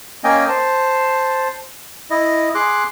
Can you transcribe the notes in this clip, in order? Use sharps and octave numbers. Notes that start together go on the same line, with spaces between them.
A#3 C#4 D#5 G5 G#5
C5 A5
E4 D#5
G#4 C6 D6 F#6